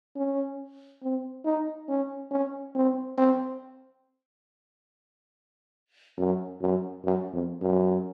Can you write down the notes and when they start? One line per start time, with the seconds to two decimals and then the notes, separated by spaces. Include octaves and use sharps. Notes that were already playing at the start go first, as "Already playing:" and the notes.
0.16 C#4
1.02 C4
1.45 D#4
1.88 C#4
2.31 C#4
2.75 C4
3.18 C4
6.18 F#2
6.61 F#2
7.04 F#2
7.33 F2
7.62 F#2